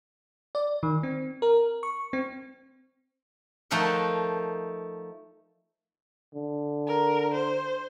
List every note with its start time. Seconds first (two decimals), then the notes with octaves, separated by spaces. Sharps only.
0.55 D5
0.83 D#3
1.03 C4
1.42 A#4
1.83 C#6
2.13 C4
3.71 F3 A3 D#4 A#4 F#5
6.35 D3
6.88 A#4
7.34 C5